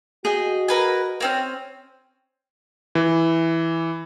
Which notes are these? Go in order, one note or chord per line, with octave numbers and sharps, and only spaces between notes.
F#4 G#4 D#5 G5
A#4 B4 G#5
A#3 C4 C#4
E3